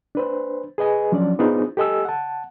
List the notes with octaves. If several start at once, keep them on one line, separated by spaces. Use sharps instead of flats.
D4 B4 C5
G#4 B4 D#5 G#5
F3 F#3 C#4 D4 D5
B3 D4 D#4 F4 G#4 C5
G4 A4 D#5 G#5 E6
F#5 A5